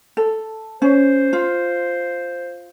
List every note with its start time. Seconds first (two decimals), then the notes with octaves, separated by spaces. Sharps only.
0.17 A4
0.82 C#4 C5
1.33 F4